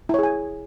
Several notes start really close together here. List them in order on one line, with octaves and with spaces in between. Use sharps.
E4 C#5 G#4 G#5